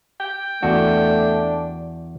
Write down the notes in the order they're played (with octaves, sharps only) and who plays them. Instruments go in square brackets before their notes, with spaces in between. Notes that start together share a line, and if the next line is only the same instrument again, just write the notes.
[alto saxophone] G5
[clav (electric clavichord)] E2 F#4 [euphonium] A3 [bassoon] D4